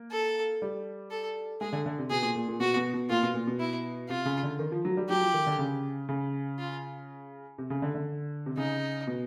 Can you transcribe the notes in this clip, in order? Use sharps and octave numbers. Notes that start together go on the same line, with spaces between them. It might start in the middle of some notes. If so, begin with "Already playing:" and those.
Already playing: A#3
A4
G3
A4
G#3 G#4
D3
D3
C3
B2 G#4
A#2
A#2
A#2
B2 F#4
B2
B2
A#2 F4
B2
A#2
B2
E4
C3 F4
C#3
D3
D#3
F3
F#3
G3
F#3 G4
F3
D#3
D3
C#3
C#3
F4
C3
C#3
D3
D3
C3
C#3 D#4
B2